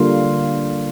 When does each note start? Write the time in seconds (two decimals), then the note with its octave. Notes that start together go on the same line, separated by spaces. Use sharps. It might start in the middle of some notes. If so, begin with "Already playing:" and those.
Already playing: D3 G3 A#3 F4